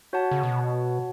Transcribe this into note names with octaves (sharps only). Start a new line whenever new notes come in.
F#4 C#5 F#5 A5
C#3
B2